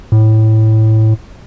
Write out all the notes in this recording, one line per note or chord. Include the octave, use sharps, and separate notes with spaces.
A2